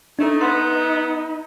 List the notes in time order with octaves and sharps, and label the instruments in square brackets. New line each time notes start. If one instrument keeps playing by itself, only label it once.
[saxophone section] A3 [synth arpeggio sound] D4 A4 [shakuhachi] D#4
[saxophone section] B3 [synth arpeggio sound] B4 C6